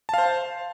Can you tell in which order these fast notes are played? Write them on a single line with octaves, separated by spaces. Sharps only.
A5 F5 C5